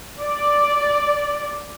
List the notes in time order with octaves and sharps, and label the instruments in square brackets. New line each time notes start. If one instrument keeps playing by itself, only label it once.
[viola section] D5